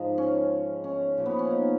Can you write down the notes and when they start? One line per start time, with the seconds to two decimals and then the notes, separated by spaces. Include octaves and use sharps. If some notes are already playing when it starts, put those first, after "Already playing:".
Already playing: G#2 F3
0.18 C#4
0.84 C#4
1.18 A#2 F3
1.26 B3
1.39 C#4
1.51 D#4